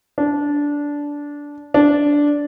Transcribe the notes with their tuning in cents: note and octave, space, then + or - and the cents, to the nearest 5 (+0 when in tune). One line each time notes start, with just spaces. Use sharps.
D4 -15
D4 -10